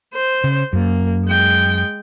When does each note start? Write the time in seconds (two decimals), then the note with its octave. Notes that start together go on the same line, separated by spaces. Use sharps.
0.14 C5
0.44 C#3
0.73 F#2 A#3
1.26 G#3 G5